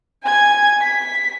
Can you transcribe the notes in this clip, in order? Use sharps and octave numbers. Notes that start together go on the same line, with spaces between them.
G#5 G#6
B6